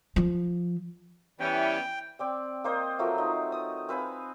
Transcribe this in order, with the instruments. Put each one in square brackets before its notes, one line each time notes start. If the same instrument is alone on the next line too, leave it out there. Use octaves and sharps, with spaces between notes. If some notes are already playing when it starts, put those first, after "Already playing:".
[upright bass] F3
[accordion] E3 G3 [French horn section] B3 C#4 [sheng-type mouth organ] G5
[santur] C4 D5 G5
A#3 C5 D#5 D#6
F3 F#3 A3 A#4
D#4
D#6
C4 B4 F5 G#5